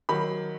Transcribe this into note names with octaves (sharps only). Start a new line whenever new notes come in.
D#3 F#3 B5